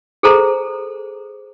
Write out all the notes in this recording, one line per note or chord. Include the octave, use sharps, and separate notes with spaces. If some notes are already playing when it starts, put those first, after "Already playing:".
G#4 A4 C5 A#5